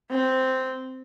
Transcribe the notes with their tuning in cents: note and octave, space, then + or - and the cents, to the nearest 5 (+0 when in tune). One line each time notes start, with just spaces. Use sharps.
C4 -5